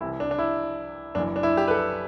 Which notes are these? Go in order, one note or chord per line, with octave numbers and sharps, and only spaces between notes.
C2 C3 E3 E4
D4
D4
E4
F#1 F#2 E3 D4
D4
E4
G4
B4
A4